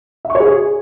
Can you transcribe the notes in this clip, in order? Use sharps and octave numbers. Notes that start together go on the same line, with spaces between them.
E5
C#6
C#5
G#4